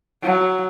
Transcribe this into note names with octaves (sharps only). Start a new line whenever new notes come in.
F#3